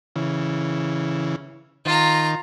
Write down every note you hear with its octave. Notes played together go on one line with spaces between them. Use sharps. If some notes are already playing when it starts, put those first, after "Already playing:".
C#3 E3
D#3 F4 A#5